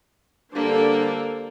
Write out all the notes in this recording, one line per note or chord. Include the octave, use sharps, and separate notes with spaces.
D3 G3 A#3 D4 A4 C5